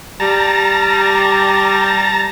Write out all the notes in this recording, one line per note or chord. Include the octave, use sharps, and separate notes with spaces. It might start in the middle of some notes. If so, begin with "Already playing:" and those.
G3 A5 A#5